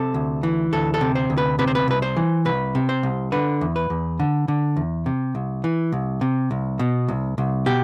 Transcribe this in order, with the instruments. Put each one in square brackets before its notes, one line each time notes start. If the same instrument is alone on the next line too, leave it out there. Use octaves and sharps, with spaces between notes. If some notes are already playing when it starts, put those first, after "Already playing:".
Already playing: [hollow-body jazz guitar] C3 A4
D2
E3
D2 A4
A4
C3
C5
D2
B4
C3 B4
C5
B4
C2 B4
C5
E3
C2 B4
C3
C5
C2
D3 B4
E2
B4
E2
D3
D3
E2
C3
C2
E3
C2
C3
C2
B2
C2
C2
B2 G4